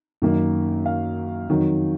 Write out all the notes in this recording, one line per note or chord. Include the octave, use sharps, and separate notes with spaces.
F#2 D#3 A#3
F5
F2 D#3 F#3